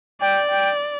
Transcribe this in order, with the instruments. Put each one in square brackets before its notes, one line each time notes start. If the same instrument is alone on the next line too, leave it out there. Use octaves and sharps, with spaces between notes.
[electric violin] D5 [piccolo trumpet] G5
[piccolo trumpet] G5